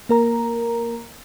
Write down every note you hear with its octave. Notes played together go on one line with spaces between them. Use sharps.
A#3 A#4 A#5